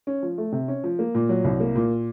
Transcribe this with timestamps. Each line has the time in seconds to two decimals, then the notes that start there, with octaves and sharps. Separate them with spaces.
0.07 C#4
0.23 F3
0.38 A3
0.52 C3
0.68 C#4
0.84 F3
0.99 A#3
1.15 A#2
1.29 F#3
1.44 C2
1.60 A#3
1.75 A#2